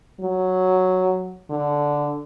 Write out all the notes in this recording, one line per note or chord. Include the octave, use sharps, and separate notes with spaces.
F#3
D3